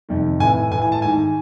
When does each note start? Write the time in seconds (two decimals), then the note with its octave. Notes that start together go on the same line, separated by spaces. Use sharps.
0.09 F2 C3 D#3
0.40 A2 E3 G#5
0.71 A2 E3 G#5
0.82 G#5
0.92 A5
1.02 G#2 D#3 G#5